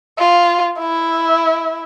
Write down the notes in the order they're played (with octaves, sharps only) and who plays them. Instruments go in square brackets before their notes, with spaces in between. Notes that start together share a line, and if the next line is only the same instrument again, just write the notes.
[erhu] F4
E4